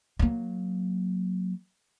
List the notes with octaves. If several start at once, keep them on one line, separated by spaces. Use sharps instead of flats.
F#3 A#3